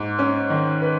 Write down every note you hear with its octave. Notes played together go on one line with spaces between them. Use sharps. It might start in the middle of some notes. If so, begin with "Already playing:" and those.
Already playing: G#2
C#4
D#3
B4